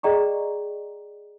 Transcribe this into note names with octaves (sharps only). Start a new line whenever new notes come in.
G#4 D5 D#5 G5 A#5 C#6